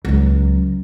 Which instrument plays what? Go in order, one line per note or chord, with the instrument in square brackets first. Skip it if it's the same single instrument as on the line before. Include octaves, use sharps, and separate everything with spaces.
[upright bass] C#2 F#3